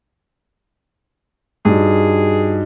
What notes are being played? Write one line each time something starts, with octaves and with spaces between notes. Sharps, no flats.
G2 D#4 F#4 G#4 D#5